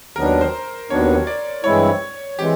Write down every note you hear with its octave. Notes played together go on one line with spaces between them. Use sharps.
D#2 D#3 F#3 B3 D4 A#4
C5
D#2 D#3 F#3 B3 D4 C#5
D5
G2 E3 G#3 C4 E4 C#5
E3 G#3 C4 G4